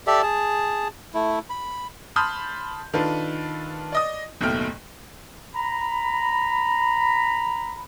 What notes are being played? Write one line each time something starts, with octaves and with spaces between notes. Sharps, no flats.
G4 A4 D5 E5
G#4 A5
A3 E4
B5
A5 B5 C6 D#6 F6 G6
D#3 D4 F4 A4 B4
D5 D#5 D#6
F#1 D#2 B2 A3 G5 F6
A#5 B5